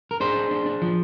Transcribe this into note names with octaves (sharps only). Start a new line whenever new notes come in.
A#4
D4 G#4 C5
D4
D4
D4
F3